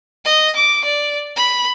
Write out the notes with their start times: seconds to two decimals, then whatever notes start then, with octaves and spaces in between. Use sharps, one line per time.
0.25 D#5
0.56 D6
0.84 D5
1.36 B5